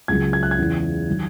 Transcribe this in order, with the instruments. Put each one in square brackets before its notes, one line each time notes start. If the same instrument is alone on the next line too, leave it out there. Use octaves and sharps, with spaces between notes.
[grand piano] C#2 C#3 F#3 G#6
G#6
F#6
G#6
E2 C#3 E3
D#3 F#3